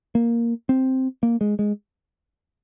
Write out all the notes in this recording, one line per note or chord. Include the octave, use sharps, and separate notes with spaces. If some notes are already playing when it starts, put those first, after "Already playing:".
A#3
C4
A#3
G#3
G#3